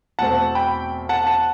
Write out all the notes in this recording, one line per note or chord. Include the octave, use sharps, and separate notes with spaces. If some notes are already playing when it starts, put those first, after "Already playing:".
E2 B2 A3 C4 F#5 A5
G5 B5
F#5 A5
F#5 A5